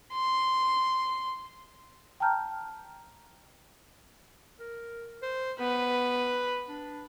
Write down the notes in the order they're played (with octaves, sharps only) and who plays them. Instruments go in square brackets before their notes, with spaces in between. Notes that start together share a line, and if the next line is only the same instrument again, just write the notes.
[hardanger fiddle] C6
[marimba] G5 A5 A#5 F6 G6
[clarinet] A#4
C5
[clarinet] B3 [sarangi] B4
[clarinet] D4